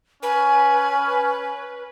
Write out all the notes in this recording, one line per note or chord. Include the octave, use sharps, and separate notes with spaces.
C#4 B4 G#5